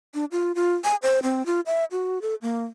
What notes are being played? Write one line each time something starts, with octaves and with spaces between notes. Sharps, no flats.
D4
F4
F4
G#5
C5
C4
F4
E5
F#4
A4
A#3